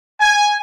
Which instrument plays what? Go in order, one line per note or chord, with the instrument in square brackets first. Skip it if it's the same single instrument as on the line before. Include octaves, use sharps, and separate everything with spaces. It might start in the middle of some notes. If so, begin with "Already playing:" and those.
[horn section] G#5